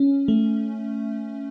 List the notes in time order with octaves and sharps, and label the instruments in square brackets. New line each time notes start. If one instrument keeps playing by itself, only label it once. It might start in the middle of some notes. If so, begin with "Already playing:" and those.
Already playing: [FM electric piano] C#4
A3